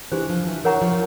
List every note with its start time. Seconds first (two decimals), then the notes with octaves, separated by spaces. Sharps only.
0.12 E3 D4 G4 C5
0.30 F3
0.47 E3
0.64 E3 A#4 C#5 F#5 A#5 C#6
0.82 F3